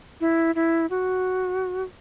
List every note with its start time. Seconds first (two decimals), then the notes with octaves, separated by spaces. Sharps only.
0.21 E4
0.55 E4
0.90 F#4